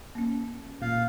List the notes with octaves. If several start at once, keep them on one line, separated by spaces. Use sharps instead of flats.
A#3 C#4
A#2 F5